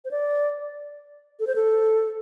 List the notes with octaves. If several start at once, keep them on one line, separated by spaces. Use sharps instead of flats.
C5
D5
A4
C5
A4